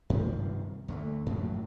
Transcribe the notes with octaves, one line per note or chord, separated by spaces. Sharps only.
G2 C3 D#3 F3
D2 D3 G3 A3
F#2 A2 F3 F#3